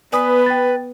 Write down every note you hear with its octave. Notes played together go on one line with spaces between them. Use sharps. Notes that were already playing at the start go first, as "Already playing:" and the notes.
B3 B4 D5 G#5 D#6
G5 A6